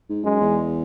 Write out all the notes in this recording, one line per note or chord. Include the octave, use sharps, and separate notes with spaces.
G#2
F#2 G#3
E2